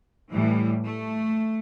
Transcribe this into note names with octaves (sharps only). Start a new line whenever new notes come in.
A2 E3 G3
A3